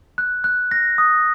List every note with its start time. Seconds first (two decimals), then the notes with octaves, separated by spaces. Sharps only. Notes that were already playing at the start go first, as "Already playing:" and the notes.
0.18 F#6
0.44 F#6
0.71 A#6
0.98 D#6